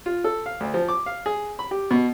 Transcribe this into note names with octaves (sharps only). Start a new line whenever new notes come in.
F4
A4
F5
D2
F3
D6
F5
G#4
B5
G4
B2